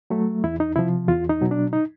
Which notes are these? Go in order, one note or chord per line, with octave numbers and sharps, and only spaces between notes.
F#3 A3
E2 E4
D#4
C3 F3 E4
E2 F4
D#4
B2 F#3
D4
D#4